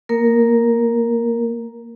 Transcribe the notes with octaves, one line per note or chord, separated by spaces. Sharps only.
A#3 A#4